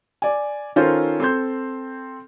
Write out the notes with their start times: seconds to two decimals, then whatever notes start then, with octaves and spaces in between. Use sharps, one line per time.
0.22 D5 G#5
0.76 D#3 C#4 F4 A4 A#4 C5
1.20 C4 A4 C6 G6